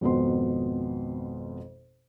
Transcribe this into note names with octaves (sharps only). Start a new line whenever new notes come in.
G#1 F2 B2 B3 C6